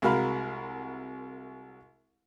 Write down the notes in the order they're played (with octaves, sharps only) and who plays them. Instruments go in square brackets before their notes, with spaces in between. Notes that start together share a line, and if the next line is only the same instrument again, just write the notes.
[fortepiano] C2 G#3 F#4 A#4 F5 B5